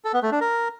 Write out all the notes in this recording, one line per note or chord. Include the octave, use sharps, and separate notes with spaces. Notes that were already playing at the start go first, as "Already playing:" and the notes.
A4
B3
A3
D4
A#4